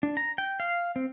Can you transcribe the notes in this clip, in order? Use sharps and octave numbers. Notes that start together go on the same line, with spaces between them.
D4
A#5
G5
F5
C4